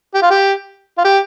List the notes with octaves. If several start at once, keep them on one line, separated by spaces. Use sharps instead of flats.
G4
F4
G4
F4
G4